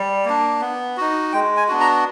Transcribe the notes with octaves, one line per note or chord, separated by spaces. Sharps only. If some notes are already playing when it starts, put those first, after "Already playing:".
Already playing: G3
A#3 D4
B3
D#4 F#4
G#3 G5
G#5
B3 D4 F#4
A#5